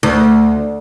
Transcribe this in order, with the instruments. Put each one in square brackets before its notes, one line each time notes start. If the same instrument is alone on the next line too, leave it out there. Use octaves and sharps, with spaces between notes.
[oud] D2